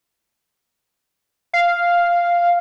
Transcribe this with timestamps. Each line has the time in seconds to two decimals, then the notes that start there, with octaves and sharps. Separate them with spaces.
1.53 F5